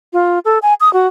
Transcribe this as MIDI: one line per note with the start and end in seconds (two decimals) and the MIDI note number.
0.13 0.39 65
0.45 0.58 69
0.62 0.74 80
0.80 0.92 87
0.93 1.07 66